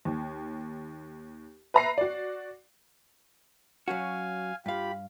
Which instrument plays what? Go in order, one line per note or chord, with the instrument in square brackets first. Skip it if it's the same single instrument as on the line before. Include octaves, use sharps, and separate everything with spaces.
[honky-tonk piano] D#2
B4 E5 A#5 B5 C7
F#4 D5
[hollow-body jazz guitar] F#3 C#4 F#4 [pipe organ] F5 G#5
[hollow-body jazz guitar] G2 F5 [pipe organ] F4 G4 B5